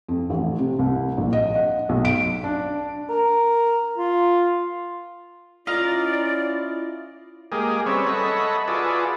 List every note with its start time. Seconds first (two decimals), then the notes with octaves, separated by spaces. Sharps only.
0.08 F2
0.30 A1
0.58 C3
0.79 C2
1.18 A#1
1.33 D#5
1.55 F#5
1.89 B1
2.05 D7
2.44 D4
3.09 A#4
3.98 F4
5.67 C#4 E4 F4 D5 D#5 A#5
7.52 G#3 A#3 G4 G#4
7.86 G3 C4 C#4 B4 C#5 E5
8.06 A4 C#5 D#5 E5 F#5 B5
8.68 F4 F#4 G#4 B4 D5 E5